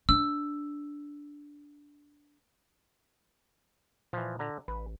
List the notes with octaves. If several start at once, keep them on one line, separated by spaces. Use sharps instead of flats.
D4 E6
A#2 E3 F3
D3 A#5
A1 B4